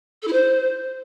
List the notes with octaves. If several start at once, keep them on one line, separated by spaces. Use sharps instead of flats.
A4
E4
C5